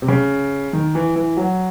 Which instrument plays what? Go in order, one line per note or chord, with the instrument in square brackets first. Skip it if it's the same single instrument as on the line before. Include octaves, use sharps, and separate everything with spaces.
[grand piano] C3
C#3
D#3
E3
E3
F#3